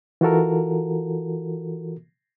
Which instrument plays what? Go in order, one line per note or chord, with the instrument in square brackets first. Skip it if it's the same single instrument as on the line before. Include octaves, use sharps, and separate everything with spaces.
[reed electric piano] E3 F4 F#4 A4 A#4